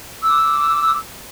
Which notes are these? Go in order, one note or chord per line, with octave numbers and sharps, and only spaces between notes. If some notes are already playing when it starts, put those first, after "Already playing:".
D6 E6